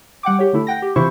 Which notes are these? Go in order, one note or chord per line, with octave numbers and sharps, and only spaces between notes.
G3 F#5 G5 D6
G4 C#5
D3 A3 E4
F#5 G5 A#6
G4
C3 E3 E4 F4 C5 C#6